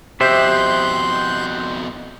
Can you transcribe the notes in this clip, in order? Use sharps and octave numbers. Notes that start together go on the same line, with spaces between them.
F2 B2 G4 C5 E5 C6 F#6 G6